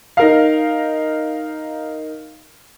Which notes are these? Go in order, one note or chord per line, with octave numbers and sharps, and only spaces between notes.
D#4 A#4 F5